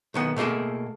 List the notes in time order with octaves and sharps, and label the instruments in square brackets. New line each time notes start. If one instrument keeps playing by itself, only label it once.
[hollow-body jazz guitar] B1 D#3 B3
B2 A3 A#3 G#4 A4